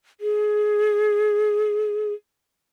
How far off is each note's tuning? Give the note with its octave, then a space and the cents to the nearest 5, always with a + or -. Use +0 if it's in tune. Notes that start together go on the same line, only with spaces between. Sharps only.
G#4 +20